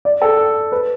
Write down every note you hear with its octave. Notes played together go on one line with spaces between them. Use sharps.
D5
A4
B4